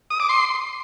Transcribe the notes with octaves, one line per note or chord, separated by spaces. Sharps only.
D#6
D6
C6